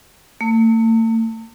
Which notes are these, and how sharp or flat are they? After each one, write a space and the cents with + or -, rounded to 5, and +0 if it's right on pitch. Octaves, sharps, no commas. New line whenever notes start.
A3 +45